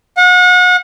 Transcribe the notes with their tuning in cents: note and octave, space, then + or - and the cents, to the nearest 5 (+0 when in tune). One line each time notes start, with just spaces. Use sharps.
F#5 -35